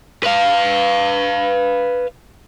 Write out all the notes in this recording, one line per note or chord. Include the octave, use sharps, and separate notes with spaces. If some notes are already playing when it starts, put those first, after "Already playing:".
B4 F5